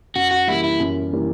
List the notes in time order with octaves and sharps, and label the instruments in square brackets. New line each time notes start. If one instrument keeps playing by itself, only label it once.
[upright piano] F#2 [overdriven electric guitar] F#4
[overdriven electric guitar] F#4
[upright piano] E3 G3 A#3 [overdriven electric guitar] E4
[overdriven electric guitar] E4
[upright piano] F#2
E3 G3 A#3